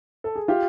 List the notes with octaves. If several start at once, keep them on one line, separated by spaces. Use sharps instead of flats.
A4
G#4
F4 G4